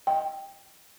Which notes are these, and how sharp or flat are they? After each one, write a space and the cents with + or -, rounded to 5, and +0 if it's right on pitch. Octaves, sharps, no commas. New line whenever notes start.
D#5 +0 G5 +0